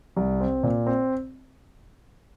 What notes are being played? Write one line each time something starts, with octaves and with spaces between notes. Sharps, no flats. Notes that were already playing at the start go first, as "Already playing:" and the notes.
C2
C4
A#2
C4